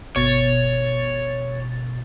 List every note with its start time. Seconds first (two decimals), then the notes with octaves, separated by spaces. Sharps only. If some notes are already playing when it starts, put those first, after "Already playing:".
0.16 G1 B2 C#5 A6